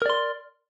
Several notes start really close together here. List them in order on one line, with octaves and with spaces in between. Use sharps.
A#4 D5 C6